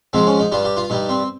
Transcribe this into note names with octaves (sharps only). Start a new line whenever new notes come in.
G#2 F3 G#3 C4
C#4
D#4
G2 G3 F4
G4
F4
G2 G3 D#4
C4